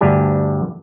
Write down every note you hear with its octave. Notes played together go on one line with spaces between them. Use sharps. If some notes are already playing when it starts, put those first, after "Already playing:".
D2 G2 D4 G4 G#5